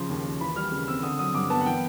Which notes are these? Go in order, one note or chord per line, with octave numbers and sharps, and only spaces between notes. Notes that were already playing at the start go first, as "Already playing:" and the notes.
Already playing: C#3 F3 C6
D#2
D#2
E3 B5
G3 F6
C#3
C4 E6
D3 D#6
F#3 D#6
G2 D6
B3 A5
F#5
E3 G5